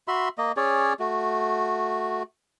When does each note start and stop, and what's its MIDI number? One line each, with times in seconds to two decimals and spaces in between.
0.08 0.29 66
0.08 0.29 76
0.08 0.29 83
0.08 0.29 84
0.38 0.52 58
0.38 0.52 75
0.57 0.93 61
0.57 0.93 68
0.57 0.93 73
0.57 0.93 74
1.00 2.23 57
1.00 2.23 66